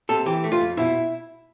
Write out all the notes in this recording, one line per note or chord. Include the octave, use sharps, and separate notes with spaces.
C3 A4
E3 G4
A3
F4
F2
B2 E4